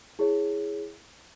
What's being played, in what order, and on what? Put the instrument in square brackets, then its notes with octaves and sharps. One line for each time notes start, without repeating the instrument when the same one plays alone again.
[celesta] E4 G#4 C#5